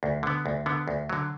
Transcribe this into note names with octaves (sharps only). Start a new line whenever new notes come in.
D2
D3 B3
D2
D3 B3
D2
D3 F#3